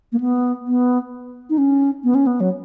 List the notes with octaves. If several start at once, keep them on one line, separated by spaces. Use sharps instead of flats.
A#3
B3
B3
D#4
C#4
B3
C#4
B3
F#3